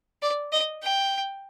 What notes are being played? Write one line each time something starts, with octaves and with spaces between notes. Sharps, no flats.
D5
D#5
G5